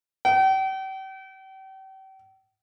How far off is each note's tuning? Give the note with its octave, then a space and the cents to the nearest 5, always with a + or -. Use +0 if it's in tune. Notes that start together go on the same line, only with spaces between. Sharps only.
G5 -40